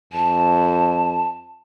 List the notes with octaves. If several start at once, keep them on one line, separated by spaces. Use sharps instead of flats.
F2 A5